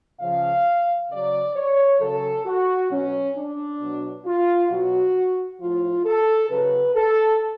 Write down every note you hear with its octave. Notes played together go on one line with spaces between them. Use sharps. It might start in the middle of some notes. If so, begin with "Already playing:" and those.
C#3 F3 F5
C#3 F#3 D5
C#5
C#3 F#3 A4
F#4
B2 F#3 C#4
D4
B2 F#3
F4
B2 F#3 F#4
A2 F3 F4
A4
C#3 F#3 B4
A4